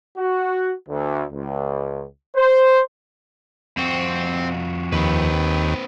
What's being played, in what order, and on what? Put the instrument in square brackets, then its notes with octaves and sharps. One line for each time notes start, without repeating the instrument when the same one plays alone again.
[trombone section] F#4
D2
C#2
C5
[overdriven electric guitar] F2 F#4 [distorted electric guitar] C4
[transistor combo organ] D#2 [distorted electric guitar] C4 B4